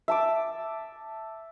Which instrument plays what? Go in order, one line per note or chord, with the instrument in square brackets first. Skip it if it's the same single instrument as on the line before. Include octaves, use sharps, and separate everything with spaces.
[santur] E5 A5 D6